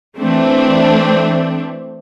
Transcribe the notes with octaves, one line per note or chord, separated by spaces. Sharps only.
E3 A3 C4 D4